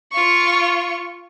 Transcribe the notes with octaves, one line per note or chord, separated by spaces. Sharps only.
F4 C#6